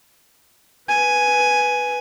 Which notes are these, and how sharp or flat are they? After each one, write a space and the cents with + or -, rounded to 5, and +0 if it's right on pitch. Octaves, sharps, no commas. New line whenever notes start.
B4 +0 G#5 +5